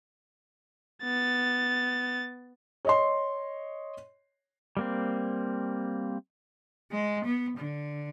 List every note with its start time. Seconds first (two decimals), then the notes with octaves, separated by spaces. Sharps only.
1.04 B3 A6
2.85 C#5 D#5 C6
4.77 G3 A#3 C4
6.91 G#3
7.25 B3
7.57 D3